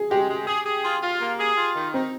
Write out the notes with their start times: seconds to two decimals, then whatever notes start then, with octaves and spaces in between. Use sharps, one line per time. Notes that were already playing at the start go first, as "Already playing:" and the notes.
Already playing: G#4
0.11 G#3 G4
0.29 G#3
0.47 G#4
0.66 G#4
0.84 F4
1.03 F4
1.21 A#3
1.39 G#4
1.57 F4
1.76 D#3
1.94 C4 D#4